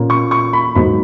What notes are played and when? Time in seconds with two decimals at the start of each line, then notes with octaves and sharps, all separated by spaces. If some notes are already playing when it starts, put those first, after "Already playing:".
Already playing: A#2 A#3 C#4
0.10 C#6
0.31 C#6
0.53 B5
0.75 G#2 F#3 A#3 D#4 B5